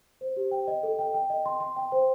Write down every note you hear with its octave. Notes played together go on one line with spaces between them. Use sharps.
C5
G4
G5
D#5
A4
G5
G5
D#5
C6
C6
G5
C5